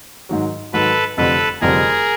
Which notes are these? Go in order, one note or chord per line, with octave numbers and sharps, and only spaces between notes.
G#2 D#3 F#3
G#2 D#3 F#3 A4 B4
F1 F2 D3 G3 C4 A4 B4
F1 F2 D3 G3 C4 G#4 A#4